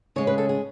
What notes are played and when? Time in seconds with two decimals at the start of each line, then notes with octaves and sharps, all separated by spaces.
0.16 C#3 G#3 C#4 C#5
0.27 B4
0.38 A4
0.49 G#4